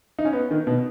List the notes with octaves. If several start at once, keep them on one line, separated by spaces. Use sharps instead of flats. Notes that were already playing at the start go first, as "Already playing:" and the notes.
D#4
C#4
B3
D#3
B2